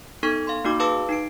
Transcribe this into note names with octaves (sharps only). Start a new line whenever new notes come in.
B3 D#4 A4 C#6 G#6
F5 C6
A#3 D#4 F#4 D6
G#4 B4 F5 A5 D6 E6
D#4 C7 D7